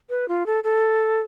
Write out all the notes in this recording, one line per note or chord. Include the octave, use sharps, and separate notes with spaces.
B4
F4
A4
A4